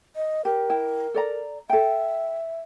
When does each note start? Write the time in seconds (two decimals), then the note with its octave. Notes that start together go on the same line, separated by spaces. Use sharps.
0.16 D#5
0.45 G4 A#4
0.70 E4 G5
1.14 A4 D5 A#5
1.70 A4 E5 G5